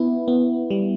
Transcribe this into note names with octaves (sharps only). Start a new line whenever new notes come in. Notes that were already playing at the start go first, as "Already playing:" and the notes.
Already playing: B3 E4
B3
G3